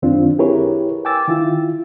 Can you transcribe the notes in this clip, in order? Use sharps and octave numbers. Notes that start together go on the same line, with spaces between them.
F#2 D#3 C4 D4 F4
E4 G4 G#4 A#4 B4 C#5
G5 G#5 D6 E6 A6
D#3 E4 F4